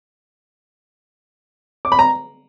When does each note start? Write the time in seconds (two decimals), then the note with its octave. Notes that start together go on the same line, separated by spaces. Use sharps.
1.85 D6
1.92 B5
1.99 A#5